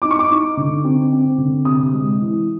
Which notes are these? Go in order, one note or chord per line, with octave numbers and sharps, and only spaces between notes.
D#4 D6
C#6
D6
D#4
D3
C4
C4
D3
C3 D#6
G#3
E3